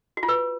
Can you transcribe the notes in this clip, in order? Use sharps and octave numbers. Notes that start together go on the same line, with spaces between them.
F#4
F4
B4